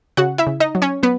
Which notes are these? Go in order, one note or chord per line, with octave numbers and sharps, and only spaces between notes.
C#3 F#4 F#5
E4 E5
C#3
D#4 D#5
F#3
C#4 C#5
F#3 B3 B4